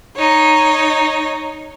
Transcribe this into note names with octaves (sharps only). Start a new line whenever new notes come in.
D#4 C#5